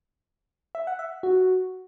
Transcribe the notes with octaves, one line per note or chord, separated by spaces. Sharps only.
E5
F#5
E5
F#4